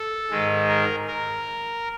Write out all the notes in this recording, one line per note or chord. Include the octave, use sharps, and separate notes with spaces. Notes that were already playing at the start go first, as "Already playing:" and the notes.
Already playing: A4
G#2 D#3 G#3
A#4
A#4